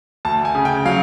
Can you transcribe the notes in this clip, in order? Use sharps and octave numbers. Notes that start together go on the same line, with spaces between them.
D2 A5
G#5
C#3
G5
F#3 F5